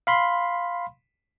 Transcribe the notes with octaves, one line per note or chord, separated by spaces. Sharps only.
F5 B5 C6